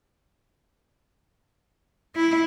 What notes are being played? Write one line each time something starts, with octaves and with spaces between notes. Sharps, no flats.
E4